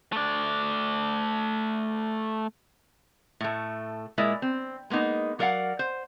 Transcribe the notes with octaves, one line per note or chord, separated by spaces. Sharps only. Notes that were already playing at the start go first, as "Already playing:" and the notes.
A3 D5
A2 A3
A#2 G#3 E4 A#4 D5 E5
C4
G#3 A#3 B3 D#4
F#3 A#4 D5 F5 F#5
C5